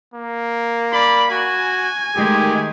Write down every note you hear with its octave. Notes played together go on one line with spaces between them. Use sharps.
A#3
D5 B5
F#4 G#5
D#3 G#3 A3 G4 G#4